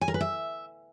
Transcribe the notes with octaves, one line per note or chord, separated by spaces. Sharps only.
G#5
A#4
B4
E5